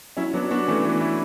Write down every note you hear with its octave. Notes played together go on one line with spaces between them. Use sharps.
F#3 C#4 E4
F#3 B3 D4
B3 D4 F#4
E3 A3 C#4
E3
E4